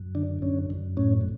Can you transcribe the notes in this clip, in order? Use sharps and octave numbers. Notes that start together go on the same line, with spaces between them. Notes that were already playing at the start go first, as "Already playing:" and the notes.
Already playing: F#2
D3 D4
F#2 C#4
F#2
A2 C#4